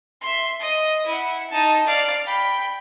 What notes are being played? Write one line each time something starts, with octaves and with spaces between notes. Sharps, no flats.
E5 C6
D#5
E4 F#5
D#4 A5
D5 F5
G5 B5